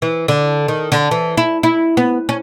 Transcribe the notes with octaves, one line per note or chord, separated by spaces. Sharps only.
E3
D3
D#3
D3
E3
E4
E4
B3
C#4